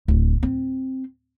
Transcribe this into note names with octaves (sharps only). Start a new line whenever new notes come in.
D1
C4